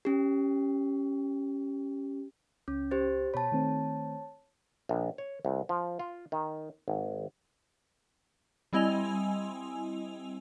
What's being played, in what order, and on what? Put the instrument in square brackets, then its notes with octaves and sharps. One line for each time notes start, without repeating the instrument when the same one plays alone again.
[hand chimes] C#4 G4
[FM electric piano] C#2 [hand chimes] C#4
[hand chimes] G4 C5 A6
[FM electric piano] B2 B5 [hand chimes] C#5 A5
[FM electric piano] D#3 A3 C4
[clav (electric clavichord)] A#1
C#5
C2
F3
F4
D#3
G#1
[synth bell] G3 C4 E4 D#5 G#5 F7